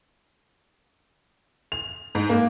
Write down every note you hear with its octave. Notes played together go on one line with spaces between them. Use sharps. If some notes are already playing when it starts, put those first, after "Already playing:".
F7
G#2
A#3